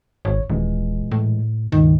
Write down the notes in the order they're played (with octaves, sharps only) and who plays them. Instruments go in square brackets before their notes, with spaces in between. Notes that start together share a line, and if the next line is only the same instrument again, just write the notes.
[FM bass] G#1 [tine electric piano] C#5
[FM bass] D#1 [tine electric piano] A#2 E3 G#3
[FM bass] A2
[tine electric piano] C#2 G2 A#2 [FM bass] D#3